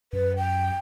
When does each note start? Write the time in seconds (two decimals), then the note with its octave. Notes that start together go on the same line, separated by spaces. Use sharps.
0.13 F#2 B4
0.37 G5